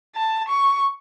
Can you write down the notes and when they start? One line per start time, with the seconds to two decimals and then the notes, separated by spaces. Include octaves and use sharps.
0.16 A5
0.49 C#6